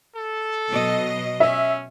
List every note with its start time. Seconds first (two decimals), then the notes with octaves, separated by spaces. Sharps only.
0.15 A4
0.68 B2 F#3 D#5
1.40 C#4 E5